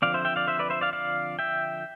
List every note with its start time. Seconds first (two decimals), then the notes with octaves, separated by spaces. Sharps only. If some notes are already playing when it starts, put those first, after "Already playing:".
0.02 D3 F3 C4 D5 F5
0.14 C5 E5
0.25 E5 G5
0.36 D5 F5
0.47 C5 E5
0.59 B4 D5
0.70 C5 E5
0.81 D5 F5
0.93 D5 F5
1.39 E5 G5